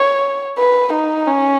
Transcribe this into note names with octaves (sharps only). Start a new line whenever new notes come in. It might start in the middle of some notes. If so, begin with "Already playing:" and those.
Already playing: C#5
B4
D#4
C#4